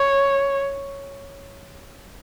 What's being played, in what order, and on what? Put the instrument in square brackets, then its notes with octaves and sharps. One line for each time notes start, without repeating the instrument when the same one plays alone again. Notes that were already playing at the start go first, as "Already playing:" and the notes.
Already playing: [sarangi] C#5